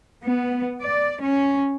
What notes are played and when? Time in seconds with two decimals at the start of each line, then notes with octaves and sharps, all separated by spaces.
0.25 B3
0.81 D5
1.23 C#4